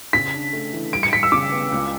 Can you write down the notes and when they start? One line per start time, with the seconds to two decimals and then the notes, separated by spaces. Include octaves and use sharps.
0.13 C#3 B6
0.34 D4
0.53 A3
0.73 E3
0.92 G3 D7
1.03 C#7
1.13 G3 B6
1.23 E6
1.32 C#3 D6
1.52 B3
1.72 C#2